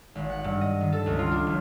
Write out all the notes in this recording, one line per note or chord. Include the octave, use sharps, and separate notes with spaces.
G#1
F#5
G2
D#5
D#3
A4
C#2
F4
D4
F#1